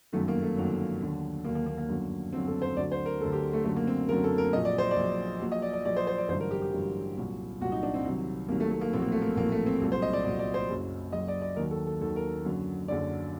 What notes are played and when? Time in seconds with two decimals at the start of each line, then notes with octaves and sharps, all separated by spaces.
0.12 G1 F#2 D#3 F#3 A3
0.28 A#3
0.42 A3
0.56 G1 F#2 D#3 F#3
1.01 D#2 D3 F#3
1.45 D#2 D3 F#3 A#3
1.55 A#3
1.66 A#3
1.77 A#3
1.89 G1 F#2 D3 F#3
2.33 G1 F#2 D3 F#3 C4
2.47 A4
2.62 C5
2.76 D2 D3 F#3 D5
2.92 C5
3.06 A#4
3.21 F#3 A4
3.24 D2 D3
3.32 G4
3.53 A3
3.64 F#1 F#2 D3 F#3 A3
3.76 A#3
3.87 C4
4.09 F#1 F#2 D3 F#3 A#4
4.24 A4
4.38 A#4
4.53 A#1 A#2 F#3 D#5
4.65 D5
4.78 C5
4.91 D5
4.96 A#1 A#2 F#3
5.40 A#1 A#2 F#3
5.52 D#5
5.62 D5
5.73 D5
5.85 A#1 A#2 F#3 D5
5.96 C5
6.07 C5
6.18 D5
6.28 A1 G2 D3 F#3 C5
6.40 A#4
6.51 G4
6.62 G4
6.72 A1 G2 D3 F#3
7.17 C2 A#2 F#3
7.60 C2 A#2 F#3 F#4
7.72 D#4
7.83 D4
7.94 C4
8.04 C2 C3 D#3 F#3
8.48 C2 C3 D#3 F#3 A#3
8.60 A3
8.70 A3
8.81 A#3
8.93 A#1 A2 F#3 C4
9.02 A#3
9.12 A3
9.22 A#3
9.37 A#1 A2 F#3 A#3
9.52 A3
9.66 C4
9.81 C2 A#2 F#3 A4
9.92 C5
10.02 D#5
10.13 D5
10.24 C2 A#2 F#3 D5
10.39 D5
10.54 C5
10.69 F#1 F#2 F#3
11.13 F#1 F#2 F#3 D#5
11.28 D5
11.42 D5
11.56 D#2 D#3 F#3 A#4
11.71 A4
11.87 A4
12.01 D#2 D#3 F#3 A4
12.16 A#4
12.45 F#1 F#2 D3 F#3
12.88 F#1 F#2 D3 F#3 D5